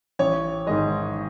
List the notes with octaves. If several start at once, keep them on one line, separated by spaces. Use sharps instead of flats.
A1 C#5
G#2 D#3 G#3 D#5